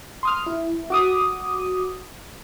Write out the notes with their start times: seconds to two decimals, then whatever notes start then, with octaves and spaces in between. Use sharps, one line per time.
0.23 C6 D#6 F6
0.46 E4
0.90 F#4 D6 D#6